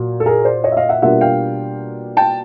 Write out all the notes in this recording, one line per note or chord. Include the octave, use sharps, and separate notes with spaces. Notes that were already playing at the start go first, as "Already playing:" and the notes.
Already playing: A#2 F#3
A4
G#4 A#4
C5 D5
C#5 D#5
E5
D#5 F5
E5 F#5
B2 G3 A#3 D4 F4 E5 F#5
F5 G5
G5 A5